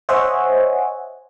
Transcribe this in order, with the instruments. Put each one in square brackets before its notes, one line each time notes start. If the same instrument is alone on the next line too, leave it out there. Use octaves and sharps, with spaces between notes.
[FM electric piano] C5 C#5 D#5 E5 F#5 G#5